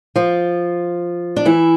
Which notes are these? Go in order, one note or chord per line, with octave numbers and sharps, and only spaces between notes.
F3 F4
D4
E3 E4